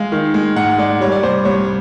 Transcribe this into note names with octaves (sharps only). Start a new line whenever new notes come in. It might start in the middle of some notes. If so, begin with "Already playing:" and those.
Already playing: G#3 F5
D#3
G#3
G#2 F#5
G#3 D5
G3 C#5
D5
C2 C5
C2 C#5